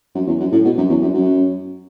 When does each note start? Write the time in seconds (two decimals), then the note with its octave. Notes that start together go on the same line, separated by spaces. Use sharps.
0.15 F#2
0.27 E2
0.40 F#2
0.52 A2
0.65 B2
0.78 F#2
0.90 E2
1.02 F#2
1.15 F#2